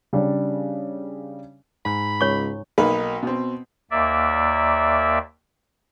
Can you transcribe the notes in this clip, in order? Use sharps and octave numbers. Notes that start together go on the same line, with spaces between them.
C#3 G3 D4
G#2 B5
C#2 C#5 C#6
B1 A#3 D#4 A#4 B4
B2 C4
D#2 A#3 D5 E5